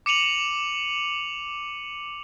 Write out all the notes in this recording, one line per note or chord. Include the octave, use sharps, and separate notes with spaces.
D6 C#7 D#7 F7 F#7